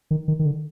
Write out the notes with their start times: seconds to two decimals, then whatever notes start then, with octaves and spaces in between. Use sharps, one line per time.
0.11 D#3
0.28 D#3
0.39 D#3
0.46 D3